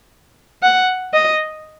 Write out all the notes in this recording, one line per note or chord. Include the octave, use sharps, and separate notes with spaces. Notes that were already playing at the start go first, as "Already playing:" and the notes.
F#5
D#5